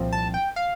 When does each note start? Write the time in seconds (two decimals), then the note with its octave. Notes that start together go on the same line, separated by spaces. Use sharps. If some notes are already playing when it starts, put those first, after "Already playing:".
Already playing: C2 A#2 F3 C4
0.13 A5
0.34 G5
0.56 F5